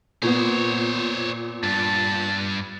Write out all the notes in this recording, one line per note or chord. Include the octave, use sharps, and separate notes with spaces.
A#2 B3 C5 C#5
G2 A5